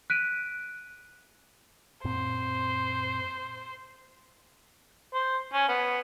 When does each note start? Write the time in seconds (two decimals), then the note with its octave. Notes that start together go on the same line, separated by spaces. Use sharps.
0.10 F#6 B6 D7 D#7
2.04 F#2 A#2 C4 C5
5.14 C5
5.53 C#4
5.68 B3